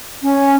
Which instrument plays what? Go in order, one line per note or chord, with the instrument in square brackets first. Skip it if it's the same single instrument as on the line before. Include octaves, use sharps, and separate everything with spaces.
[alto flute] C#4